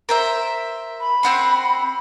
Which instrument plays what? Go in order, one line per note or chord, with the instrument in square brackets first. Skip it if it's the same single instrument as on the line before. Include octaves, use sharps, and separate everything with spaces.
[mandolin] A#4 C5 E5
[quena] B5
[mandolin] C4 F#4 C6